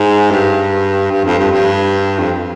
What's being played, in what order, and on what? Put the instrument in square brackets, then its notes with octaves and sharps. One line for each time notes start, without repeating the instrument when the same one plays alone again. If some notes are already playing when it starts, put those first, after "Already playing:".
Already playing: [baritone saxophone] G#2
G2
G2
F2
G2
G2
F2